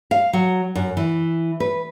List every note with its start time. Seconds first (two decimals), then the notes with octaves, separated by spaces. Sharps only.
0.11 F5
0.33 F#3
0.75 F#2
0.97 E3
1.60 B4